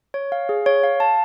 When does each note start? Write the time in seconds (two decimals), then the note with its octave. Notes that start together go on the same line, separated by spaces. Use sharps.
0.14 C#5
0.32 F5
0.49 G#4
0.66 C#5
0.84 F5
1.00 A5